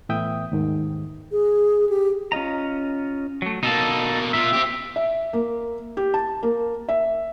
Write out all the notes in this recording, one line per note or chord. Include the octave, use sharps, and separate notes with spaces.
A2 E3 B3 E5 G5 D#6
D#2 G#2 D#3
G#4
G4
C#4 F4 D#5 A#5
F#3 A3
B2 A#3 D#4 A4 A5
A#2 F4 E5
C4 G4
E5
A#3
G4
A5
A#3
E5